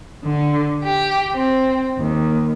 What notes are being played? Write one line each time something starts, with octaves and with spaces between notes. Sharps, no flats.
D3
G4
C4
D#2